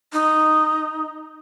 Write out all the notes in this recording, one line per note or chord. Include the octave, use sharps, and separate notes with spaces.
D#4